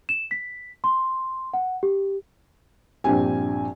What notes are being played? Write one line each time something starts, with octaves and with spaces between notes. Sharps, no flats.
E7
B6
C6
F#5
G4
A#1 G2 C4 G4 G#5